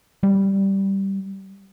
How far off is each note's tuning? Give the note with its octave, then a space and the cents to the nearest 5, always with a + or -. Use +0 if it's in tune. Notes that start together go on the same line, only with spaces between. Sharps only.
G3 -5